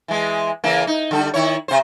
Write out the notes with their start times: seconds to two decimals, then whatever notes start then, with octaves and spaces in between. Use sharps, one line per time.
0.08 E3 G#3
0.64 C#3 E3 A#3
0.87 D#4
1.11 D3 G3 A4
1.34 D#3 E4 C#5
1.68 C3 C5